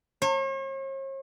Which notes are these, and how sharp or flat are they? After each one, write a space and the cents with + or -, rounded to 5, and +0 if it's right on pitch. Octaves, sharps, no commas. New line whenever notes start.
C#5 -45